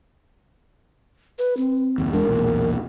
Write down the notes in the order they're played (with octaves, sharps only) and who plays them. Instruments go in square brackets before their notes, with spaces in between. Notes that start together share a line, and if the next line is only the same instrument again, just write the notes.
[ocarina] B4
C4
[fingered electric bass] F#1 D#2
[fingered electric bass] E2 G#3 D4 [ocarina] A#4
[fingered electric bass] B1 E2 A#2